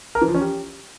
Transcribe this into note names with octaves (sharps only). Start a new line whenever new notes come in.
A#4
E3
F3
C#4
G4